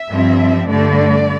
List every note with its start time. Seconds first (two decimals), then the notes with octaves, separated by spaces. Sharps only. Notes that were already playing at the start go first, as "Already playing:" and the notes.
Already playing: E5
0.09 G2 F3 C4
0.68 G2 D3 A3 D5